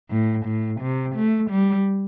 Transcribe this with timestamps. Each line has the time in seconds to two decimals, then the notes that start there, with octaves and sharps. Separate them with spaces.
0.11 A2
0.46 A2
0.81 C3
1.16 A3
1.51 G3